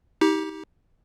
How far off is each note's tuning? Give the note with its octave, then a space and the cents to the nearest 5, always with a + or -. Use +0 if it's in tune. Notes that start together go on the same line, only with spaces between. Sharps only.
D#4 +35 G4 +0